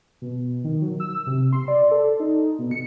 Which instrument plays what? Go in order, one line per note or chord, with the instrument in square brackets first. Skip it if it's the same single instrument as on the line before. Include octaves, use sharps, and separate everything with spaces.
[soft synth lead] B2
D#3
F#3
E6
C3
C6
D5
A4
D#4
B2
C#7